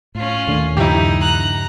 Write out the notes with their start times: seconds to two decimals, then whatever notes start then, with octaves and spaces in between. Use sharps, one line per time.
0.15 A2 C#4 F4
0.48 D#2 A#2 A3 D4
0.77 G2 C#3 F3 D#4 E4 G4
1.20 A#5 F#6